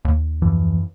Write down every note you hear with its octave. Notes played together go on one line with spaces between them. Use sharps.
D#2
F#2 E3 F3